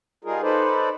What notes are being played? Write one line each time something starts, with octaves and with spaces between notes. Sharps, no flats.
G3 D#4 F4 G#4 A#4
D#4 A4 B4 C5 D5